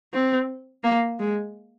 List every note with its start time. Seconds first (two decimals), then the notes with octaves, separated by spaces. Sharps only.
0.13 C4
0.84 A#3
1.19 G#3